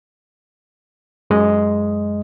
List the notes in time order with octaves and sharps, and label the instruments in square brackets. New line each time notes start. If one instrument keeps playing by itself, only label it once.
[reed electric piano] F#2 G#3 D#5